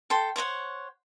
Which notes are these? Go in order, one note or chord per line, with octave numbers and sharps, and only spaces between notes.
A4 G5 C6
C5 C#5 D#5 F#5